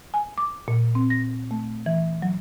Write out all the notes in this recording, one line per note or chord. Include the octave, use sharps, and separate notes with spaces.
G#5
D6
A#2
C4
A#6
A3
E3
F#3